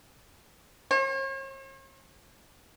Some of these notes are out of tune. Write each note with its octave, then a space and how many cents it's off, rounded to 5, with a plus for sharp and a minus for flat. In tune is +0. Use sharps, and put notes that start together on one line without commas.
C#5 -45